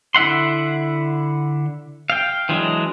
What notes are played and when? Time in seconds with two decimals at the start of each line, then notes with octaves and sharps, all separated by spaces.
0.15 D3 E4 E5 F#5 C6
2.10 F5 G5
2.49 E3 F#3 G#3 D4